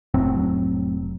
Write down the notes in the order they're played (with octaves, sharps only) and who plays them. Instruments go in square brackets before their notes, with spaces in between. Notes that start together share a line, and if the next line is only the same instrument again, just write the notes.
[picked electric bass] F1 A2 F#3 C4